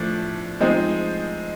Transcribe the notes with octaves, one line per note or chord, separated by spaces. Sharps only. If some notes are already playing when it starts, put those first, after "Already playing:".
Already playing: A2 F3 A3 D4
F3 G#3 C4 D#4